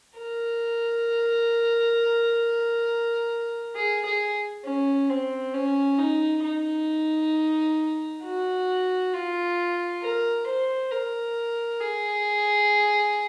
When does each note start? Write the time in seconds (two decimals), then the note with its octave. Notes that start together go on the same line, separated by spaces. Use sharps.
0.18 A#4
3.76 G#4
4.06 G#4
4.65 C#4
5.10 C4
5.54 C#4
5.99 D#4
6.44 D#4
8.23 F#4
9.13 F4
10.02 A#4
10.47 C5
10.91 A#4
11.80 G#4